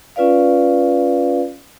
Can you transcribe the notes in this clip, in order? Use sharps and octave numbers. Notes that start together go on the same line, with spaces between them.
C#4 F4 B4 D5 F5